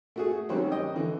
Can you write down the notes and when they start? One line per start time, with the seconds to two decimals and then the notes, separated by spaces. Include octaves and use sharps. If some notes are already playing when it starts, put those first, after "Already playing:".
0.16 A3 F#4 G#4
0.49 D#3 F#3 G3 C4 C#4 F#4
0.72 D#5 G5
0.95 D3 E3